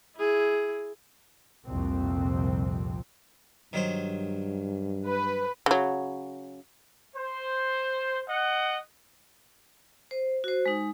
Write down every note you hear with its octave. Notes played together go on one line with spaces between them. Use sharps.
E4 G#4
C2 F2 A#2 F3 C4
G2 D#3 F#3 C5
B4
C#3 F#3
C5
D#5 F#5
C5
F#4 C5
G#3 D#4